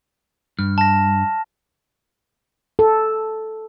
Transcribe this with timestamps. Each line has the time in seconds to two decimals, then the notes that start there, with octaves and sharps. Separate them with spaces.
0.59 G2 F6
0.78 A5 A#6
2.79 A4